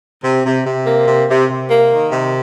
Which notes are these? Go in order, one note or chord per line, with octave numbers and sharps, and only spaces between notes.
C3
C3
C3
A#3
C3
C3
C3
A#3
D#3
C3